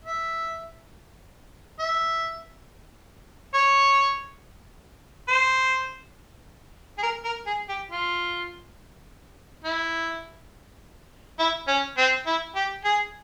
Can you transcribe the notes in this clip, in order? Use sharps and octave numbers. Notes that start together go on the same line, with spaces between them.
E5
E5
C#5
C5
G#4
A#4
A#4
G#4
G4
F4
E4
E4
C#4
C4
E4
G4
G#4